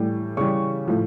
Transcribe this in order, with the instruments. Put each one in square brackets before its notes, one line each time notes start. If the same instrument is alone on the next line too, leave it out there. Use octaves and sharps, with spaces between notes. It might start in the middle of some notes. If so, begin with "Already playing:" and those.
Already playing: [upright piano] A2 E3 G3
C#3 E3 G3 C#6
A2 F3